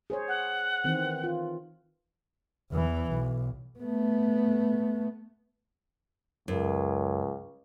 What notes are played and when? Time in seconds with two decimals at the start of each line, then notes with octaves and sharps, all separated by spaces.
0.10 G#4 C5 C#5
0.28 F#5
0.84 D#3 E3 C4
1.24 F4
2.71 E2 E3
3.13 B1
3.80 A3 B3
6.48 C#2 F#2